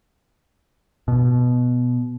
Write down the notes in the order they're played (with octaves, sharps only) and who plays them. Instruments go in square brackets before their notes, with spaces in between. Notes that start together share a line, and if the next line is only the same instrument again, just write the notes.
[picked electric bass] B2